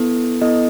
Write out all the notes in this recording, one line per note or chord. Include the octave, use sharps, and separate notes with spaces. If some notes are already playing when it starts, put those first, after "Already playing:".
Already playing: B3 E4 A4
B3 E4 A4 D#5